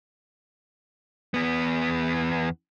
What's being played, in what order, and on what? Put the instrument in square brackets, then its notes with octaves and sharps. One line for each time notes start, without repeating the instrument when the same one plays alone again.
[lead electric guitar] E2 B3